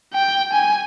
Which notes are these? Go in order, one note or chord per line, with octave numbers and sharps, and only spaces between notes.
G5
G#5